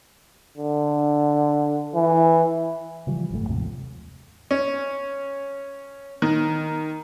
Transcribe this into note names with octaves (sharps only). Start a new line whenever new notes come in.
D3
E3
C#3 E3 F3 G3
G#1 F#2 C#3 A3
D#2 G#2 C3 F3
C#4
D#3